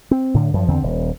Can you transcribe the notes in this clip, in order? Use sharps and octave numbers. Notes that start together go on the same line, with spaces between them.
C4
A2 D3
F#2 F3
E2 D3 C4
D#1